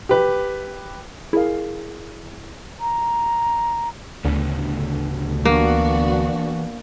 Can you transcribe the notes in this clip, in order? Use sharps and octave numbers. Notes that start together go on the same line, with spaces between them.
G4 B4
E4 G#4 A#4 F5
A#5
D2 A2 C#3 B3
E3 A#3 B3 D4 F#4